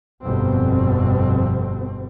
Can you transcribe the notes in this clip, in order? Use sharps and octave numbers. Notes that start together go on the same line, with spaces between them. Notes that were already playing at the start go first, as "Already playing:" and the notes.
G1 F2 B2 C4